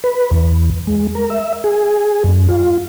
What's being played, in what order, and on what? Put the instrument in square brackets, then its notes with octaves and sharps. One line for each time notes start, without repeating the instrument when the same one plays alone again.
[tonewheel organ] B4
E2
G#3
A#4
E5
G#4
F#2
F4